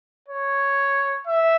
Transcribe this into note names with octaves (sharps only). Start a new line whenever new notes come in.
C#5
E5